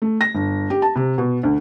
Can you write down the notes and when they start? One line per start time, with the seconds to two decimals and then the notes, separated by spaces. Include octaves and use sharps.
0.02 A3
0.21 A#6
0.35 G1
0.70 G4
0.82 A5
0.96 C3
1.18 B2
1.43 D2